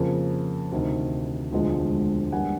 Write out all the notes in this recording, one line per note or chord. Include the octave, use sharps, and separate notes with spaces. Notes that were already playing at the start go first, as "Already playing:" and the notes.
Already playing: F2 C#3 F3 A#3
D2 C3 D#3
E1 D2 D3 F3 G#3
G2 E3 G3 A#3 D4 F#5 G#5